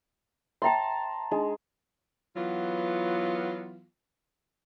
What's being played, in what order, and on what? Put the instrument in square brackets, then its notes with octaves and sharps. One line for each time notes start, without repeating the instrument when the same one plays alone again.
[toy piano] C#5 E5 G5 [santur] A5 A#5 C6
[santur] G#3 [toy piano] D4 D#4
[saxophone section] E3 F#3 B3 F4